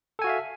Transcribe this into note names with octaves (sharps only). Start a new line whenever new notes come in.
F#4 A4 E5 F5 G#5